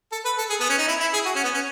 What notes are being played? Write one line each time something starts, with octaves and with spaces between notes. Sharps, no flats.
A4
B4
A4
G#4
B3
C#4
D#4
E4
E4
G#4
F#4
C#4
B3
C#4